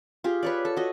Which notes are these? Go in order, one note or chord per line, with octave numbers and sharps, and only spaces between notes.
F4 G4 G#4
B4 C#5 D5
A4
F#4 D#5